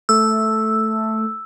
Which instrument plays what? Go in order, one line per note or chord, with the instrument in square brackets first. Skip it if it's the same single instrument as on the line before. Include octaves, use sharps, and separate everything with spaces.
[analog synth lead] A3 [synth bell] E6